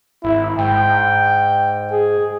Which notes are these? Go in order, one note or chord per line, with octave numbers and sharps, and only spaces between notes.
G#1 E4
G#2 G5
G#4